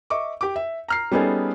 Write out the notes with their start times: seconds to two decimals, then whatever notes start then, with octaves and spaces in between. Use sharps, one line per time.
0.10 D#5 E5 C#6 D6
0.41 G4 D6
0.56 E5
0.88 A#5 F6 C7
1.11 G3 B3 C#4 D#4 G#4 A4